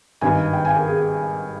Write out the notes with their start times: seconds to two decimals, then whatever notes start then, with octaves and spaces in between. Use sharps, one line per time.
0.21 G#1 G2 D#3 G#5
0.53 G5
0.65 G#5
0.76 A#4
0.86 G#4